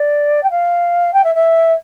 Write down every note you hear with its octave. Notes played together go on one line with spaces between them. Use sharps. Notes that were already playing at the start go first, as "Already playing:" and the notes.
Already playing: D5
G5
F5
G5
E5
E5